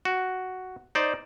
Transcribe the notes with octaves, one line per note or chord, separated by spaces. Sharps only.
F#4
D#4 C5 D5